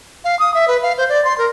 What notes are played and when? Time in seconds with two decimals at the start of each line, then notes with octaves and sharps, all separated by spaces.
0.24 F5
0.39 D#6
0.54 E5
0.68 B4
0.83 F5
0.98 C5
1.09 D5
1.25 C6
1.38 A#4